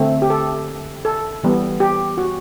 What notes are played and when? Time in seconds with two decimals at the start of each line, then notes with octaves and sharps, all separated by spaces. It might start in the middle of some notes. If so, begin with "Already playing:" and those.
Already playing: D3 A3 C4
0.22 G4
0.30 A4
1.05 A4
1.43 E3 G3 B3
1.80 G4
2.18 F#4